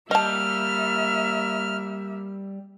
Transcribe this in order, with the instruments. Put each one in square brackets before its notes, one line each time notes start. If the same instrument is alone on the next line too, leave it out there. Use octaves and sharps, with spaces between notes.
[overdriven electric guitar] G3 [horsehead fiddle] A#3 E5 [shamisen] D#5 A5 [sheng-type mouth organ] F6